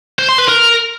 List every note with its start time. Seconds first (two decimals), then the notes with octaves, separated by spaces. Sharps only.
0.19 C5
0.29 C6
0.38 B4
0.48 A#4